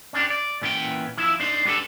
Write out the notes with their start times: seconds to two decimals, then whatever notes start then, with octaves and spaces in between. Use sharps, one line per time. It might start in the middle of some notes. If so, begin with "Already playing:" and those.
0.13 C#4 D4 G4
0.30 D5
0.62 A#2 E3 B3 C#4 D5 G5
1.17 F3 E4 E5
1.40 D4 D#4 C5
1.65 G3 B3 D4 G4 A4